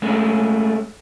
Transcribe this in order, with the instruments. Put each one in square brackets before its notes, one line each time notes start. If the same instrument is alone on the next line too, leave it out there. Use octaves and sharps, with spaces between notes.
[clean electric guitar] G#3 A3 C#4